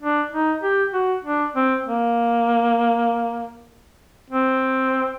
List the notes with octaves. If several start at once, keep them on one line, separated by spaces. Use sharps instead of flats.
D4
D#4
G4
F#4
D4
C4
A#3
C4